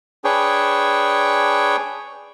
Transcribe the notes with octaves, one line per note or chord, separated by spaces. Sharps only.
D4 G#4 B4 C#5 G5